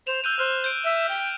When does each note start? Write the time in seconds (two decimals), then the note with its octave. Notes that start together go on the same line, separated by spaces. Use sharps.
0.07 C5 E7 F7
0.24 E6 F#6 G6 D#7
0.39 C5 F6 F#6
0.64 G6 D7
0.84 E5
1.09 G5